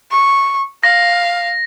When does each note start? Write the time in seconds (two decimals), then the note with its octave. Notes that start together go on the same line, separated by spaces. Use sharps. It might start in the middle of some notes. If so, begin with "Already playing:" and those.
0.11 C#6
0.83 F5 A#6